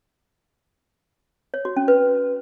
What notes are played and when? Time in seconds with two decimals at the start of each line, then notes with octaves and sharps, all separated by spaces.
1.54 C#5
1.65 F#4
1.77 C#4
1.88 B4